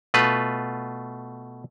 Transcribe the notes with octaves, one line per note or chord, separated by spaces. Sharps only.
B2 A3 F4 B4